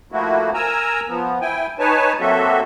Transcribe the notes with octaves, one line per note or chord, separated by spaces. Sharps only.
F3 A3 A#3 E4 F#4
A#4 G#5 A#5 E6
F3 B3
E4 G5 G#5
D#4 B4 C#5 G#5 A5
F#3 A#3 C4 F#4 A4 E5